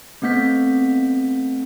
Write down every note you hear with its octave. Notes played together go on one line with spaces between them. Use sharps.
A3 B3 C4 G6 B6